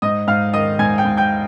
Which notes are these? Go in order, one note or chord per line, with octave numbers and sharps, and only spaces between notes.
G#2 D#5 D#6
G#2 F5 F6
D#3 D#5 D#6
G#2 G#5 G#6
G5 G6
G#2
G5 G6